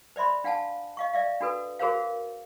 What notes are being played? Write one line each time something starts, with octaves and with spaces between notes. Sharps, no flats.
C5 D5 E5 B5 C6
D4 F5 F#5 G#5 A5
D#5 F5 C#6
D5 E5 F5
D4 F#4 A4 B4
F#4 G#4 A#4 C5 C#5 F5